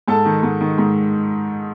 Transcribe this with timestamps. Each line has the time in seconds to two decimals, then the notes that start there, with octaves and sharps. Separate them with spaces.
0.08 G#2 A4 A5
0.25 D#3
0.43 G#2
0.61 D#3
0.78 G#2